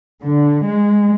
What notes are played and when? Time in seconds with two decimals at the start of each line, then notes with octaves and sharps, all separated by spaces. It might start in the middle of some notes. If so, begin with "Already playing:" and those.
0.23 D3
0.65 G#3